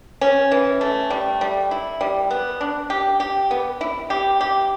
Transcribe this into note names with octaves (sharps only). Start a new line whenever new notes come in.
C#4
E3
A3
G3
G3
E4
G3
B3
D4
G4
G4
B3
E4
G4
G4